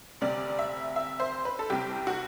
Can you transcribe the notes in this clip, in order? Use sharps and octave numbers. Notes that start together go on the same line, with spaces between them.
D2 C3 G3 D5
E5
E5
C5
B4
A4
C2 C3 G3 G4
F#4